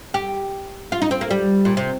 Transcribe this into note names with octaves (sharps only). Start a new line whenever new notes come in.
G4
F4
D#4
C4
A#3
G3
A#2
C3